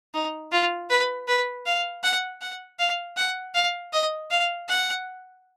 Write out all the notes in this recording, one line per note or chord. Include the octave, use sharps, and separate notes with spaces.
D#4
F4
B4
B4
F5
F#5
F#5
F5
F#5
F5
D#5
F5
F#5